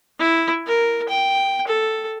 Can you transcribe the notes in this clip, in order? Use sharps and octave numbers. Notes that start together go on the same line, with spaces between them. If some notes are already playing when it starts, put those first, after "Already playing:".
E4
A#4
G5
A4